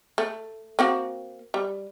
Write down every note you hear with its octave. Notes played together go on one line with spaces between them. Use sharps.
A3
A#3 C4 F#4
G3